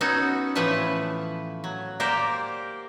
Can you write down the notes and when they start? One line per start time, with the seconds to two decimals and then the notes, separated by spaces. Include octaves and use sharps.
0.01 B3 C#4 D#4 F#4 A4
0.55 A2 E3 F3 A3 B4 A5
1.64 F#3
2.00 A#3 G4 A#4 C5 D5